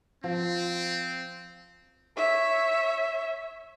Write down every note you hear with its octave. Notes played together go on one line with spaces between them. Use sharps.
F3 C4
C#5 E5